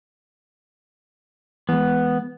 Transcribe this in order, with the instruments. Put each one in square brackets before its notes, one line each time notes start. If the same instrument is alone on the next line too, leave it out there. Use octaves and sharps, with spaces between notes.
[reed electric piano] E3 G#3 [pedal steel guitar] B3